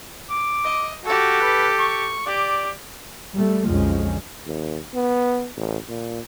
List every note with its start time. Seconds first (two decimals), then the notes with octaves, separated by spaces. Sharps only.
0.30 D6
0.65 D#5
1.05 F#4 G4 A4
1.42 B4
1.79 C#6
2.27 G4 D5
3.33 G3 A3
3.65 B1 F2 D3 F3 G#3 C#4
4.46 D#2
4.94 B3
5.57 A1
5.89 A#2